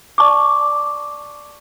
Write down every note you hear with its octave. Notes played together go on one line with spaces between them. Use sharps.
D5 A5 C#6 D6